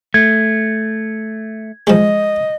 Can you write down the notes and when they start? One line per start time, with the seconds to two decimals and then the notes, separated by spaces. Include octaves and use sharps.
0.14 A3 G#6
1.87 F3 G#3 D#5